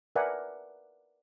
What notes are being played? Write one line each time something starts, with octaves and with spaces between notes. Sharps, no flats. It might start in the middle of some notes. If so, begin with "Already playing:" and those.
A#4 B4 D5 E5 F#5 G#5